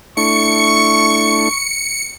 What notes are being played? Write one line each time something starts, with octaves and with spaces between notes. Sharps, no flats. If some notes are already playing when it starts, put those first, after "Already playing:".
A3 D4 E4 C#6 C#7